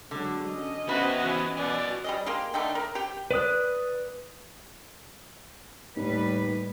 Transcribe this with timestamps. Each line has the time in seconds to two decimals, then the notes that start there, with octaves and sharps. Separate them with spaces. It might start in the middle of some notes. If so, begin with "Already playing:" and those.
0.11 D3 F#3 G#3
0.46 C#4 D#5
0.89 C3 B3 C4 F#4 B4 E5
1.25 E3
1.57 B2 F#4 D5 G#5
2.04 G3 G#4 D#5
2.26 A#3 G4 G#4 C6
2.54 D3 A3 D#4 G5
2.75 A#4
2.95 G4 G5
3.31 B4 D5 D#6 F#6
5.96 D#2 A2 G3 B4